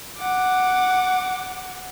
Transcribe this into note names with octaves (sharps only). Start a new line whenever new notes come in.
F#5 D6